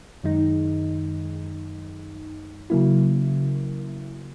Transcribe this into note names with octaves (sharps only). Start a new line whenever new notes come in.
F#2 D#3 G#3 D#4
C#3 F#3 A#3 E4